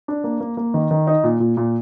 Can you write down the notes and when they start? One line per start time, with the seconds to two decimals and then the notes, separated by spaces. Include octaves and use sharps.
0.08 D4
0.24 A#3
0.41 A#3
0.57 A#3
0.74 D#3
0.91 D#3
1.07 D#4
1.24 A#2
1.40 A#2
1.57 A#2